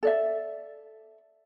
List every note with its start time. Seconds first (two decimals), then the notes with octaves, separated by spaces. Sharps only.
0.03 A4 D5 E5